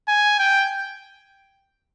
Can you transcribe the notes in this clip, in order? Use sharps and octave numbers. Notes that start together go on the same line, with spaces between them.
G#5
G5